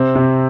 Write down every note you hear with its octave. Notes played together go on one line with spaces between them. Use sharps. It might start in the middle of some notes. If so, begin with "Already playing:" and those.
Already playing: C3 C4
C3